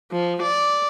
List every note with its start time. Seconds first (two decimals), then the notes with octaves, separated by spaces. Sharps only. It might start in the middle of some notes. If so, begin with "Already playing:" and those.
0.12 F3
0.42 D5